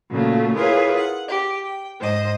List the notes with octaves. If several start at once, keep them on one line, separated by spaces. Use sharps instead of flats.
A#2 C#3 F#3 A3 F4
E4 F4 G#4 A#4 B4 C#5
F#5
G4
G5
G#2 C5 D#5 D#6